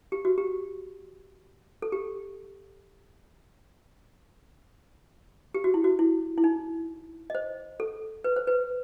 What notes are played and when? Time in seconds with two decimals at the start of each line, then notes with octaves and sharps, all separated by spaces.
0.12 G4
0.25 F#4
0.38 G4
1.82 A4
1.92 G4
5.54 G4
5.64 F#4
5.74 E4
5.84 F#4
5.99 E4
6.38 E4
6.44 D#4
7.30 D#5
7.35 C5
7.80 A4
8.24 B4
8.36 C5
8.47 B4